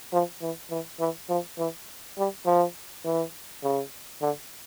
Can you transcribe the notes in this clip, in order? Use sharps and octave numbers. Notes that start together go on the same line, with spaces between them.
F3
E3
E3
E3
F3
E3
G3
F3
E3
C#3
D3